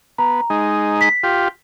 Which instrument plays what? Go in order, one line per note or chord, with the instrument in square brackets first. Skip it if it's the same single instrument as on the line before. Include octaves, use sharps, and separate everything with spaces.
[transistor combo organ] B3 [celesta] A#5
[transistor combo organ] G#3 D#4
[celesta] B6
[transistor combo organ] F4 G4